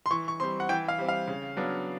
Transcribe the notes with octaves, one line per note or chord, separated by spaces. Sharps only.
C6
E3 C#6
C#6
G3 C4 C6
F#5
E3 G5
F5
G3 C4
F5
C#3
F#3 B3 D4